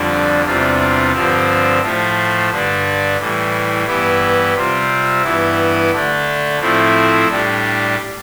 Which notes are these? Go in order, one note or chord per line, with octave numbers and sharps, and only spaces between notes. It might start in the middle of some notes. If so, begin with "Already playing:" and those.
Already playing: F2 D3 G3 D4
E2 C3 G3 D4 F4
G2 D3 F3 C4
A2 F3 A3
G2 D3 G3 D4
A2 E3 G3
G2 E3 B3 E4 G4
C3 G3 C4 F4
G2 E3 B3 E4
D3 A3 D4
A2 F3 A3 C4 E4
A2 G3 D4 G4